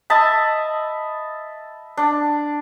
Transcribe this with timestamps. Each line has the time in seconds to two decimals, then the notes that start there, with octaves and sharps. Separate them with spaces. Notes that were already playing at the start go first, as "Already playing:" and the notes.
0.10 D#5 E5 A5 B5
1.97 D4